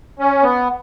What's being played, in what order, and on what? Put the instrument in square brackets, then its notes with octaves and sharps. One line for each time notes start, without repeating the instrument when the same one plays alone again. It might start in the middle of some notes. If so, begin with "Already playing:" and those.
[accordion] C#4
B3